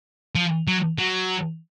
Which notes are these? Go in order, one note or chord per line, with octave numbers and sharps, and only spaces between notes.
F3
F#3
F#3